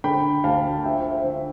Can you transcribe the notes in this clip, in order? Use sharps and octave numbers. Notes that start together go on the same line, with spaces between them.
D3 G5 B5
D2 F5 A5
F3 E5 G5
C5 E5
D3